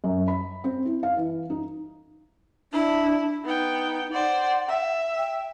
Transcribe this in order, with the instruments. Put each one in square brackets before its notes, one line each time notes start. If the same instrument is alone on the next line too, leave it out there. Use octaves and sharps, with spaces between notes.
[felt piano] F#2
B5
C4
E4
F5
E3
D#4
[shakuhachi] D4 [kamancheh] E4
[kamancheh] B3 G5 [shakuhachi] D#4
[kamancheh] C5 D5 [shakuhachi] F#5
[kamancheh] E5
[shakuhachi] G5